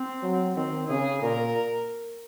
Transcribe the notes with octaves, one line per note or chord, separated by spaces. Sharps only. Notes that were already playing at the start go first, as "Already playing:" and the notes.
Already playing: C4
F#3
D#3 C4
C#3 G#4
A#2 A#4